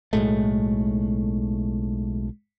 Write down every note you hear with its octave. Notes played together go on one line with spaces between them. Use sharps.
B1 A2 G#3 A3